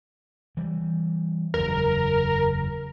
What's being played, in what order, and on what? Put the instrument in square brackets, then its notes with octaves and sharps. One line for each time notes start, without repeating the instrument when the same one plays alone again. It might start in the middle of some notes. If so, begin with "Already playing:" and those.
[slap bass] E3 G3
[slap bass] F#1 E2 [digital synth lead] A#4